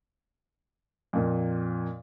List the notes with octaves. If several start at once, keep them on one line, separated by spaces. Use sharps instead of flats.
F2 A#2